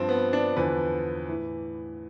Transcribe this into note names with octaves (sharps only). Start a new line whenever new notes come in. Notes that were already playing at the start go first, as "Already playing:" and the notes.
Already playing: G2 F3 C4
B3
D4
E2 D3 F3 B4
A2 E3